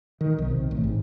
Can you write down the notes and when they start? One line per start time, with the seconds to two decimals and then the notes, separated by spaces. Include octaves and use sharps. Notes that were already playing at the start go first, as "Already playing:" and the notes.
0.21 D#3
0.38 B1
0.51 C3
0.71 A1
0.84 G#2